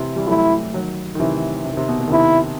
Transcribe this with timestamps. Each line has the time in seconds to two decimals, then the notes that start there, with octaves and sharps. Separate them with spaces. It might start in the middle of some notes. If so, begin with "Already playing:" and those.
Already playing: C3 E3
0.16 E3 G3
0.27 F#3 A3 E4
0.74 D#3 F#3
1.15 D#3
1.20 C3 E3
1.65 C3
1.73 D#3
1.77 C3
1.88 B2
2.00 B2
2.07 D#3
2.11 C3 E4